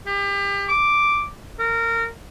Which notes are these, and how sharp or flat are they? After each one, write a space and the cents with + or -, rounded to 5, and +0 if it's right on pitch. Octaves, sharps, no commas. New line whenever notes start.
G4 +30
D6 +0
A#4 -20